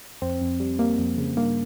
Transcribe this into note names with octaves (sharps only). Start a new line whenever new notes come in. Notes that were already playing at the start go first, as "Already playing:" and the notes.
F2 C4
F2
G3
G3 A#3
F2
C#3
G2 A#3